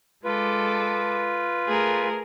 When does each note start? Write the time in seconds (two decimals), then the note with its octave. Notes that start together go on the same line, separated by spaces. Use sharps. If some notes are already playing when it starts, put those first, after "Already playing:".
0.25 G#3 F4 A4 B4 D6
1.67 A3 G#4 A#4